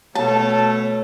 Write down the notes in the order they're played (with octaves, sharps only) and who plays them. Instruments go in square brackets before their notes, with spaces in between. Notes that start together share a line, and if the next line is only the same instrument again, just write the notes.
[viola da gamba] B2 A3 A4 [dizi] C#5 [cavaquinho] A5